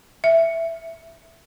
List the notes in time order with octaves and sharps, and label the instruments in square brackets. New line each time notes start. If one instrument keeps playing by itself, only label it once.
[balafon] E5